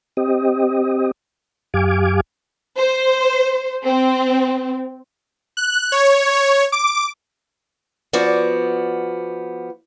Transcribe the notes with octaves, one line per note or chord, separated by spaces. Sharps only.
C4 G4 D#5
F#2 G4 F5 G#5 D6
C5
C4
F#6
C#5
D6
F3 B3 F#4 D5